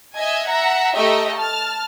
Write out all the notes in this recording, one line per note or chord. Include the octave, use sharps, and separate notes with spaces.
D#5 E5 G#5 G#6
E5 F#5 A#5
A3 G4 D#5 E5 A#5
A5 F6